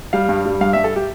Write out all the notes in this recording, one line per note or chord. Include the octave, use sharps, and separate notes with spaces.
G3 F5
G2
G3
G2 F5
G2 E5
A4
G4